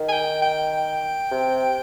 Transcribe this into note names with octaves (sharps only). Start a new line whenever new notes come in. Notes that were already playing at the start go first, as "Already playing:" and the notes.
Already playing: D#3
G#5
G5
G5
C3